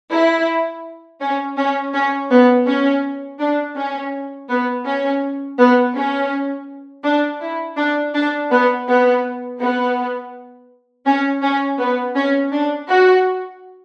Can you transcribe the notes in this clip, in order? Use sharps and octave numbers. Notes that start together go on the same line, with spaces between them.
E4
C#4
C#4
C#4
B3
C#4
D4
C#4
B3
C#4
B3
C#4
D4
E4
D4
D4
B3
B3
B3
C#4
C#4
B3
C#4
D4
F#4